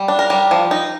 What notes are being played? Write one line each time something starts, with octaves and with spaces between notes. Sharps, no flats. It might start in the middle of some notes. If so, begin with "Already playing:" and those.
Already playing: G3
D4
A#4
G3
F3
D#4